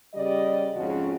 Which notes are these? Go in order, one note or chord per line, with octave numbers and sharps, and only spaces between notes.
C#3 G3 G4 D5 D#5
F2 G#2 C#3 F3 C#4 F#4